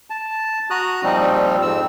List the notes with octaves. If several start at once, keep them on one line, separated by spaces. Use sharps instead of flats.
A5
F#4 A#5 D#6 F#6
A#2 F3 G3 C4 D#4
F2 G#2 C4 E6